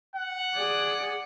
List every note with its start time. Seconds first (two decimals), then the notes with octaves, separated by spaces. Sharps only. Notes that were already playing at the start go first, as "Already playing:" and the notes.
0.16 F#5
0.55 G#4 D5